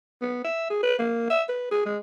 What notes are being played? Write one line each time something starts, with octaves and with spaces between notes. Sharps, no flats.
B3
E5
G#4
B4
A#3
E5
B4
G#4
G#3